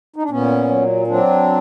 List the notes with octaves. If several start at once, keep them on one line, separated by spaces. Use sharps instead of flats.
D#4
D4
A#2 B3 C#4
F#3
F#3 C4 D4